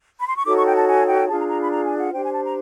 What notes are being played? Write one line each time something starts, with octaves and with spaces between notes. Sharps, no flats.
B5
C6
C#6
D#4 F#4 A4 C#5 D6
C#6
G5
A5
G#5
G5
D4 F4 G#4 A5
A#5
A#5
B5
A#5
G#5
F#5
D4 G4 C5 G5
G#5
A5
A#5